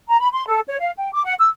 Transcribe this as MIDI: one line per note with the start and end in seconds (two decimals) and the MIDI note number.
0.08 0.19 82
0.20 0.28 83
0.32 0.46 84
0.47 0.60 69
0.67 0.77 73
0.80 0.91 77
0.97 1.10 79
1.13 1.23 86
1.25 1.34 78
1.39 1.49 88